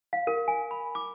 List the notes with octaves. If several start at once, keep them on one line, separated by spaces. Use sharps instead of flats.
F5
A#4
G#5
B5
D6